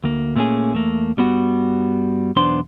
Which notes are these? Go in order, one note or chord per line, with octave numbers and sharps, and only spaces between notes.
D2 A#3
A#2 A3 A#3 C4 C#4 G#4
E2 A3 A#3
G2 G3 B3 F#4
B1 E2 B3 D4 C5 C6